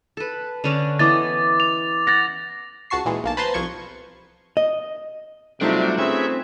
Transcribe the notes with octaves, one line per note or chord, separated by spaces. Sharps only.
A4 B4
D3 C#4 D4
E3 B3 D#5 D6 A6
F7
F#5 A6 A#6
C#2 F#4 A5 C#6 C7
A#2 E3 G#3
B1 A#3 A5
B4 C5 A5 A#5 C6
C2 F3 C#6 G#6
D#5
C3 F#3 G3 A3 D4 D#4 F4
C4 C#4 G#4 B4 E5